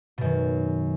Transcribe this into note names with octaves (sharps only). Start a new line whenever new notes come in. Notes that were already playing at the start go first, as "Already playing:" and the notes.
F#2 B2 D#3